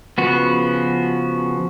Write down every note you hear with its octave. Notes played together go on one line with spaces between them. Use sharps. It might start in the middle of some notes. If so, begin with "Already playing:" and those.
C#3 F3 B3 F#4